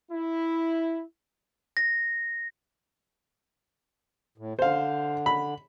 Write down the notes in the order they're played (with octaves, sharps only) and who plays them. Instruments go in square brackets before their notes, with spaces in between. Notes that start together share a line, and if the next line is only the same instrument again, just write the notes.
[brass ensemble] E4
[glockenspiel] A#6
[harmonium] A2
[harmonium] D3 [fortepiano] C5 F5
[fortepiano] B5